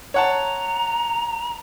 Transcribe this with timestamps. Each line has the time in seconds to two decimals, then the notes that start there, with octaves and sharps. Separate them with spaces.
0.14 C#5 F#5 A5 A#5